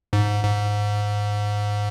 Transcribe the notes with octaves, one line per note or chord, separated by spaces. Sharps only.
G#2
G#2